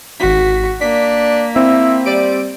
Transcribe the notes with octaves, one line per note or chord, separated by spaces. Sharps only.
G#1 F#4 B6
A#3 D4 B6
C4 E4
G3 D5 D7